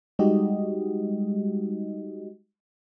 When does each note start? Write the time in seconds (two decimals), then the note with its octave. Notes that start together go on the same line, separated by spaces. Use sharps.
0.19 G3 G#3 D#4 F#4 G4 D#5